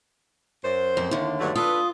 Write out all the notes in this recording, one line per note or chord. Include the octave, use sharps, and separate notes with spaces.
F#2 C5
F2 C4
D#2 D3 E5
G2 F#3 A3
D4 F4 A4 B4 D#6